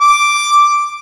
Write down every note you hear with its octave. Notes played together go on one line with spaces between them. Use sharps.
D6